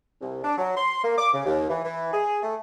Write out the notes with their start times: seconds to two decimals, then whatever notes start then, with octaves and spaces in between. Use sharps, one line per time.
0.21 C2
0.44 D4
0.58 F#3
0.77 C6
1.04 A#3
1.18 D6
1.34 C#3
1.45 D#2
1.70 E3
1.84 E3
2.13 G#4
2.42 A3